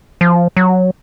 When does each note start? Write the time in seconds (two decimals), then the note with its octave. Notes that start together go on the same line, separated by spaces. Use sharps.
0.21 F3
0.57 F#3